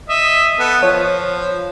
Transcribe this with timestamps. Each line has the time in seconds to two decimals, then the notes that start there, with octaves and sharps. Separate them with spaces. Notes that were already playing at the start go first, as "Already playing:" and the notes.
0.09 D#5 E5
0.59 B3 A4
0.83 F3 C#5